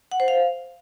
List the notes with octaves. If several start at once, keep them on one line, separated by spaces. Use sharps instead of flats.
F#5
C5
F5